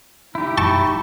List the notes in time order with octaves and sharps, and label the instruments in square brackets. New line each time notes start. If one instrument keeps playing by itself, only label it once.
[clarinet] D#4 [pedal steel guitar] E4 G4
[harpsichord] A5 C#6